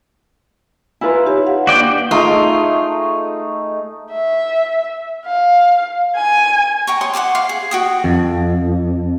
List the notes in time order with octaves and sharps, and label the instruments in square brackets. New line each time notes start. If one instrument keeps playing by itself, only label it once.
[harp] E4 F4 B4 [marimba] G#5 A#5
[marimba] D#4 G4 C#5
F5 F#5
[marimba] A#3 D4 [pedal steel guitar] F#4 D5 G5
[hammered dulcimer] A3 D#4 G#4 [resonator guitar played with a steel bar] F4
[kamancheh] E5
F5
G#5
[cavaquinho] G5 A#5 C#6
C#5 C6 D#6
F#5 A5 C6 D6
F5
G#4
F#4 G5 D#6
[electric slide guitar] F2